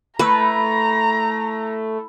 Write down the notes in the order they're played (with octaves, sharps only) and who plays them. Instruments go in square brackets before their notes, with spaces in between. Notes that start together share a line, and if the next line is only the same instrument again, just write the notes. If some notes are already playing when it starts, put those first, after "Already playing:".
[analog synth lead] A3 [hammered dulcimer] E4 [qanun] B4 [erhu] A#5